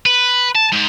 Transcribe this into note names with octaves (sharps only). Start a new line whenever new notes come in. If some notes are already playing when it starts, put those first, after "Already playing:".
B4
A5
G#2